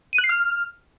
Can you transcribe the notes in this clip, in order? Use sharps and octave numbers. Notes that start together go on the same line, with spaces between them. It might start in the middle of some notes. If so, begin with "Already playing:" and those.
D#7
F#6
C7
F6